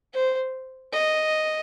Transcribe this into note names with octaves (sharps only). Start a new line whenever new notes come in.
C5
D#5